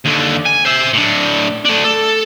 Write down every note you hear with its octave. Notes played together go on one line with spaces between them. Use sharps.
D#2 D3
G#5
C5 E5
A2 D4
A3 D4
A4